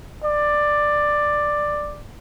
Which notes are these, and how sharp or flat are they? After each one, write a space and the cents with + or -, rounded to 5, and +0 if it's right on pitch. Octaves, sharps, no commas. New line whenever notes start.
D5 +10